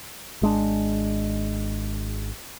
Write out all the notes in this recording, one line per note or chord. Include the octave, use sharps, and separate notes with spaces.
G#1 G#3 D4